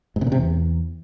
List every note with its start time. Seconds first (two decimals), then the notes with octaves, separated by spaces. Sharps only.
0.16 G#2
0.21 C3
0.27 A#2
0.32 C3
0.37 E2